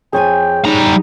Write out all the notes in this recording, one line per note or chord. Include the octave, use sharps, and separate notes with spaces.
F2 G#4 A4 C#5 G5 G#5
G3 D#4 A#5